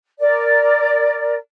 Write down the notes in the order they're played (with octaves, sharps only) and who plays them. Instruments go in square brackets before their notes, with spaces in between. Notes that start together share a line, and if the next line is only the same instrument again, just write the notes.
[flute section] A#4 D5